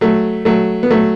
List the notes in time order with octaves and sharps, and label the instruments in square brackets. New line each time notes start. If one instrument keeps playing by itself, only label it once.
[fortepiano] F#3 A3
F#3 A3
B3
F#3 A3